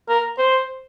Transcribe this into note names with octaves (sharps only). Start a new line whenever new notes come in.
A#4
C5